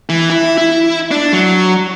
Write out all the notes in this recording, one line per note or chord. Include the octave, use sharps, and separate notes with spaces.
E3
E4
E4
D4
F#3